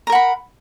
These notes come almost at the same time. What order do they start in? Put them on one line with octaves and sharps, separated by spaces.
A#5 A#4 F#5 B5